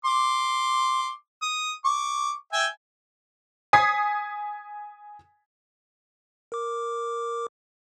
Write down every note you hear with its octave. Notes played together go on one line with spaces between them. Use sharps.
C6 D6
D#6
C#6 D6
E5 G5 G#5
G#5 D#6 G#6 B6 C7
A#4 D6